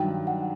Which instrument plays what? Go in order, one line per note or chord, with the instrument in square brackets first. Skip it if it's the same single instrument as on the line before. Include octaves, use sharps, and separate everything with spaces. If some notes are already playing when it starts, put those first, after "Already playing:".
Already playing: [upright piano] G2 D#3 F#3 [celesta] G5
[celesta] F#5